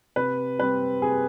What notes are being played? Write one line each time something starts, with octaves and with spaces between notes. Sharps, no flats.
C3 B4
G3 C4 B4
C3 G#4